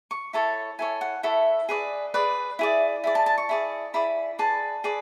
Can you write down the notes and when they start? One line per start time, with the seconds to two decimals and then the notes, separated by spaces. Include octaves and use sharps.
0.11 C#6
0.33 E4 A4 C#5 A5
0.79 E4 A4 C#5 G#5
1.01 F#5
1.23 E4 A4 C#5 E5
1.69 G#4 B4 D5
2.14 G#4 B4 D5
2.59 E4 G#4 D5
3.04 E4 G#4 D5
3.15 A5
3.26 A5
3.38 C#6
3.49 E4 G#4 D5
3.94 E4 G#4 D5 B5
4.39 G#4 B4 D5 A5
4.84 G#4 B4 D5